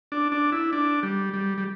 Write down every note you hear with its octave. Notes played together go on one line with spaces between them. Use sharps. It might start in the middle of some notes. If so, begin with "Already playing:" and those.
D4
D4
E4
D4
G3
G3
G3